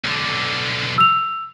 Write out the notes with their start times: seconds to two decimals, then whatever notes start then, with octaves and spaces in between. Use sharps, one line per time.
0.05 B1 D3
0.98 E6 F7